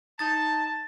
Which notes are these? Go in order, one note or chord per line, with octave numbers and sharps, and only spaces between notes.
D#4 A5 A6